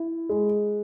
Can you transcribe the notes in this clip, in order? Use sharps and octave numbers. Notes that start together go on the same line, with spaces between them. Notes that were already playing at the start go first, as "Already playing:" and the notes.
Already playing: E4
G#3